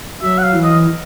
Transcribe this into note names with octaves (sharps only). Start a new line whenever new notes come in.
F#3 E5
F#5
F5
E3
D#5